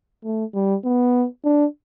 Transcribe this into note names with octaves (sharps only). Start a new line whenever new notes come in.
A3
G3
B3
D4